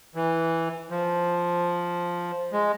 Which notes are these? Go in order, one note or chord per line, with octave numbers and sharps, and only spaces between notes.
E3
F3
G#3